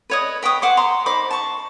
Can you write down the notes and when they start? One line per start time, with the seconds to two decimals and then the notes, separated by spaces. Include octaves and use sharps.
0.10 B4 C#5 D#5
0.43 B4 G5 C#6 D#6
0.62 C5 F#5 D6
0.77 A#5 C6
1.06 D#4 C5 B5 D6
1.31 A5 C#6